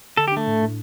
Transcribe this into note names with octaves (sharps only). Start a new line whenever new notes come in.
D3 A4
G4
A3 D4
A2
A2